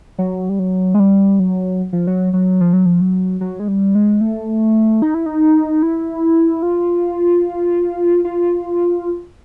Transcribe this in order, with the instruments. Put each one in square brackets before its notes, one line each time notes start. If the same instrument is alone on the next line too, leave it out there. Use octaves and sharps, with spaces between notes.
[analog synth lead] F#3
G3
F#3
G#3
G3
F#3
F3
F#3
F#3
F3
F#3
F3
F#3
F#3
G#3
G3
G#3
A3
D#4
E4
D#4
E4
F4
F4